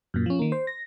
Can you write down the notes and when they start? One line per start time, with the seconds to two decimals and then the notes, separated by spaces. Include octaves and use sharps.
0.14 F#2 A#2
0.26 F3 C#4
0.39 D#3 A#3
0.52 C5
0.67 A#6